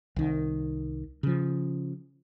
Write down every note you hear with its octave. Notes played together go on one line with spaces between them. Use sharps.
C2 D#3
C#3 F3